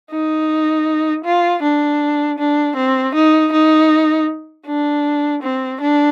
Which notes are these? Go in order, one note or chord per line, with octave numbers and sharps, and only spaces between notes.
D#4
F4
D4
D4
C4
D#4
D#4
D4
C4
D4